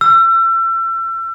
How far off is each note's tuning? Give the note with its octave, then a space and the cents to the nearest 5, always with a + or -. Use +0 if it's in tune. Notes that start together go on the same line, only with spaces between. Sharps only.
E6 +35